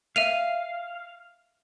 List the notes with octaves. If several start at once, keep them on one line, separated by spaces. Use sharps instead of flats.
E5 F5 D#7 F7